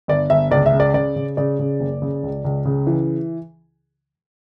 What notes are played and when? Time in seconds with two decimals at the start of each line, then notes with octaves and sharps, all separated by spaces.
0.08 G1 D5
0.30 G1 E5
0.51 C#2 D5
0.66 E5
0.73 C#3
0.80 D5
0.94 C#3 D5
1.16 C#3
1.37 C#3 D5
1.59 C#3
1.80 F#1
2.02 C#3
2.23 C#2
2.45 C#2
2.65 C#3
2.87 E3